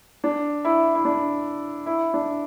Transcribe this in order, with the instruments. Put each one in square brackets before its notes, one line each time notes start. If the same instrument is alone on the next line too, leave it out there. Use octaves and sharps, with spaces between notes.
[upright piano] D4
E4
E4
D4
E4
D4